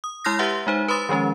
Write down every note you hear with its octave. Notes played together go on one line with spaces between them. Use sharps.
D#6
G#3 E4 C6 F6 G6 A#6
G4 B4 E5 F#5 C6
G#3 D#4 C5
B4 B5 C6 D#6 A6
D#3 F3 G#3 C#4